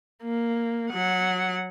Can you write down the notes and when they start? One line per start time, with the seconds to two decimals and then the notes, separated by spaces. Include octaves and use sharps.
0.23 A#3
0.90 F#3 F#5